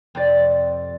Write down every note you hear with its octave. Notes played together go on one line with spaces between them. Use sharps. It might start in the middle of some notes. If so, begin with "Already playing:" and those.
F2 C3 D5